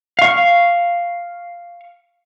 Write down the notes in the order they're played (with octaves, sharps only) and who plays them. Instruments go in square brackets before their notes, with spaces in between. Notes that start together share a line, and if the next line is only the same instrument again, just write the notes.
[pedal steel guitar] F5 C#6